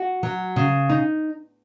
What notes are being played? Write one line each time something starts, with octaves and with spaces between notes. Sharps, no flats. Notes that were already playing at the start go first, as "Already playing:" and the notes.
Already playing: F#4
F#3
C#3
D#4